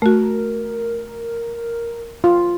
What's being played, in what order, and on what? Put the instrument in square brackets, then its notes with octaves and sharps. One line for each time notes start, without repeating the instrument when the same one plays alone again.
[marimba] A3 F#4 [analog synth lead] A#4
[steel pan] F4